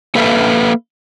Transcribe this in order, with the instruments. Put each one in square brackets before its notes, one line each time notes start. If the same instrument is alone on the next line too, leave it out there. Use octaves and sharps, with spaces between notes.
[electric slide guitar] A#3 A4 B4 E5 F5